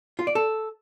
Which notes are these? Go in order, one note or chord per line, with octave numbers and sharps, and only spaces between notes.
F4
D5
A4